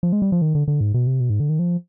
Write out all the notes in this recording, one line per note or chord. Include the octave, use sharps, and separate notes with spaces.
F3
G#3
G3
F3
D#3
D3
D3
G#2
B2
C3
B2
G#2
D3
D#3
F3